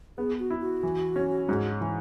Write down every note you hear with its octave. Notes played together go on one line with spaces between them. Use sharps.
B3 G#4
F#4
E4
F#4
E3
C#4
G#2
E3